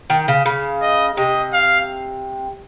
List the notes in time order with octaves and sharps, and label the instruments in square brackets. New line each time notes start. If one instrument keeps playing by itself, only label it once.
[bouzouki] D#3
C#3
C#3
[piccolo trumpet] D#5
[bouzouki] C3 [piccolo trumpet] D#5
[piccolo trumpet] F5